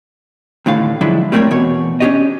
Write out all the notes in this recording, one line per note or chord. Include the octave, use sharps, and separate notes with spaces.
D#2 A2 D3 F5
D3 F3 F#3 G#3 D4 E4
G3 A3 B3 C4 A#4 C#5
E2 B2 C#5
C#4 D4 G4 C#5 D#5